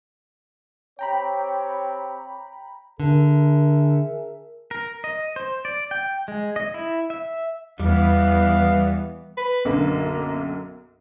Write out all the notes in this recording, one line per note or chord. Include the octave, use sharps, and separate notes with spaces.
C4 G4 C#5 G5 A#5 B5
D3 G#4 A#4 E5
A#4
D#5
C5
D5
G5
G#3
D#5
E4
E5
E2 E3 G3 B3 F5
B4
B1 F#2 D3 A#3